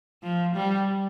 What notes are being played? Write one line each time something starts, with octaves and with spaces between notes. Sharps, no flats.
F3
G3